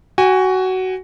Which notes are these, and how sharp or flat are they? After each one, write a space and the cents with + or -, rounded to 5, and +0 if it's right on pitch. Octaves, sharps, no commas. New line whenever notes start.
F#4 +15 G#5 -25